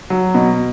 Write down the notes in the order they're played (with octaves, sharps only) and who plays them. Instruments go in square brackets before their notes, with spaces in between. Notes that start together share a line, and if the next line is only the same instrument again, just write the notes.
[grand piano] F#3
B2